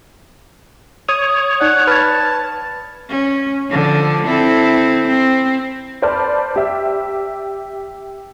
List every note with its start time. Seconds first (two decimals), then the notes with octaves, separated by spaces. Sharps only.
1.09 C#5 D#6
1.61 D#4 D5 F#5
1.87 B4 A5 F6 G#6
3.09 C#4
3.69 D3 F3
4.26 C4 E4 A4
5.07 C4
6.02 B4 C5 D5 A5 B5 F6
6.56 G4 E5